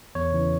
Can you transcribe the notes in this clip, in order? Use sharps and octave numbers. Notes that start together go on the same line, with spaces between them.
E2 C#5
C#3 E3